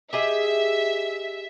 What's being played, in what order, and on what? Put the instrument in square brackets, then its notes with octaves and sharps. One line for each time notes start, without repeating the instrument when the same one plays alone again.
[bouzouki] G4 G#4 D#5 [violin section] E5